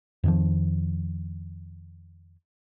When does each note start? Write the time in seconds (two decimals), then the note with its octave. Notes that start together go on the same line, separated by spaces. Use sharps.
0.24 F2 D#3 F3